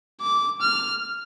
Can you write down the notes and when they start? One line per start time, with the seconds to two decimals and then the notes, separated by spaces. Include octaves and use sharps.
0.21 D6
0.62 F6